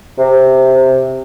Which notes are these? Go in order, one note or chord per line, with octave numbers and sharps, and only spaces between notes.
C3